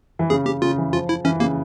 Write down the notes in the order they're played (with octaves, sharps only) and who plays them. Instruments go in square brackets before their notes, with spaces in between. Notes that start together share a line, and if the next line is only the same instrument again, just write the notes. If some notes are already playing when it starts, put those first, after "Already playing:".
[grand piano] E3
[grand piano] C#3 [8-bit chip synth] G#4
[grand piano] C#3 [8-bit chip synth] G4
[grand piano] C#3 [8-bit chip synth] F4
[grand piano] E3
[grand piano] F3 [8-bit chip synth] F4
[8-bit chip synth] E4
[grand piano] E3 [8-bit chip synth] C#4
[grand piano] C#3 [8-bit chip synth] A#3